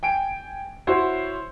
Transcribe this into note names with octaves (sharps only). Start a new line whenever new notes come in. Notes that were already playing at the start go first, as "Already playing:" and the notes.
G5 G#5 D7
E4 F#4 C5 C#5